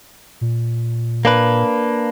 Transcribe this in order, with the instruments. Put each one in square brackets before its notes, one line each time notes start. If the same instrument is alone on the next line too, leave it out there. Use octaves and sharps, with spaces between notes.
[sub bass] A#2
[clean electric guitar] A#3 D4 B4